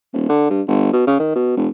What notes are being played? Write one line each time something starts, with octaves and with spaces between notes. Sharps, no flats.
D#1
D3
G2
G1
B2
C#3
D#3
B2
F1